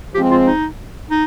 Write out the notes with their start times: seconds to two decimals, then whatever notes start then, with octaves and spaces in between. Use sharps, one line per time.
0.15 F3 G#3 C4 G4
0.31 F4
0.47 D#4
1.11 D#4